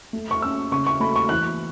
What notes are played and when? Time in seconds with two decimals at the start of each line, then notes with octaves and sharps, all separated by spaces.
0.13 A3
0.31 C#6
0.42 C#4 E6
0.72 C#3 C#6
0.87 C#6
1.00 A3 B5
1.16 C#6
1.29 E3 F#6